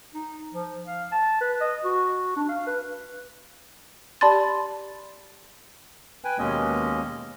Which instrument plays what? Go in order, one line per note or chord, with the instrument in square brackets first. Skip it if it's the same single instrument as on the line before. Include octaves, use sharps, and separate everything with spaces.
[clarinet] D#4
F3
F5
A5
B4
D#5
F#4
D4
F5
B4
[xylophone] G4 D5 A5 B5 C6 A6
[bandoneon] B4 G5 G#5
D#2 B2 G#3 A#3 C#4 D#5